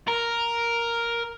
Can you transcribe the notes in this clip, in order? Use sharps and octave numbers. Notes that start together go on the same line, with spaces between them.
A#4